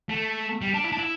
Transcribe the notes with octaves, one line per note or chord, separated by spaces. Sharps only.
A3
G3
D4
E4
D4
E4